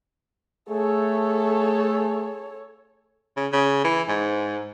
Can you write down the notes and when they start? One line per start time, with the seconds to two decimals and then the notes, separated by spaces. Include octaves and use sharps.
0.69 A3 G#4 A4 C#5
3.37 C#3
3.53 C#3
3.85 E3
4.08 G#2